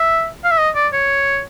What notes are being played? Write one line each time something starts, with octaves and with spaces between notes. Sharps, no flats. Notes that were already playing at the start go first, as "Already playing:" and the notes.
Already playing: E5
F5
E5
D#5
D5
C#5